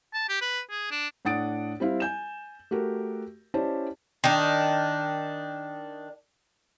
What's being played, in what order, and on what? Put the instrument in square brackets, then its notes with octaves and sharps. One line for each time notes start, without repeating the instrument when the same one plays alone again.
[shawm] A5
G4
B4
G#4
D4
[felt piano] A2 D4 F#5 D#6 A6 D7
G3 C4 E4 F5
G#5 G6 E7
A3 F#4 G4 A#4
C#4 E4 G4 C5 D5 A5
[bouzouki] D#3 D4